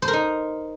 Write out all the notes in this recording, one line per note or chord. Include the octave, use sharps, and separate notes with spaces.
C5
A#4
D#4